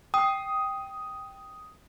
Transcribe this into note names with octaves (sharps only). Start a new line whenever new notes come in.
G5 D#6